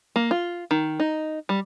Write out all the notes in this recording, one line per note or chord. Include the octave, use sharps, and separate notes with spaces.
A#3
F4
D#3
D#4
G3